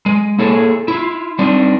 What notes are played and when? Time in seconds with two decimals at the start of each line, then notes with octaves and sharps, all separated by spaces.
0.06 G#3
0.39 A#3 E4 G#4 A4 C#5
0.88 E4 F4
1.39 G3 C4 D4 D#4